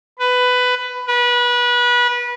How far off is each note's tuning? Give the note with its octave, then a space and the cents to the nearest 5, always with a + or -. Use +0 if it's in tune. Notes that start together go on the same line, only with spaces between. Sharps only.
B4 +15
B4 -25